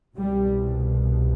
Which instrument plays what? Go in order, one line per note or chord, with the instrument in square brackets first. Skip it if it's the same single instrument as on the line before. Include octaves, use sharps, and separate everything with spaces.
[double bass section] C2 B2 G3